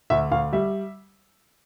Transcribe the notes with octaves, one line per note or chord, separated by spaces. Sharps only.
D2 E5
D2 F5
G3 E5